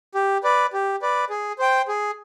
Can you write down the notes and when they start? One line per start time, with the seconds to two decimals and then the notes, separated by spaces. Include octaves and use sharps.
0.15 G4
0.44 B4 D5
0.73 G4
1.02 B4 D5
1.30 G#4
1.59 C5 G5
1.88 G#4